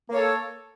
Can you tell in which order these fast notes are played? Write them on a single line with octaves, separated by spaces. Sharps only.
A#3 C#5 A4